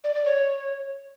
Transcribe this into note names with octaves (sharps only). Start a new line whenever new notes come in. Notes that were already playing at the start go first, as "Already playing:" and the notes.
D5
D5
C#5